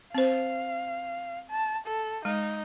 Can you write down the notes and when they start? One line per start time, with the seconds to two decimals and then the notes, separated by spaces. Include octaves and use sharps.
0.15 C4 C5 F5
1.51 A5
1.86 A4
2.25 G#3 D#4